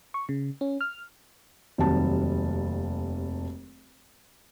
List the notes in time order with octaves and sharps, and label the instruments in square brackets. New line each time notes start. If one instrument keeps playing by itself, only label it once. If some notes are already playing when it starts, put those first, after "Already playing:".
[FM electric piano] C#6
C#3
C#4
F6
[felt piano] F1 D#2 F#3 G3 C4 A5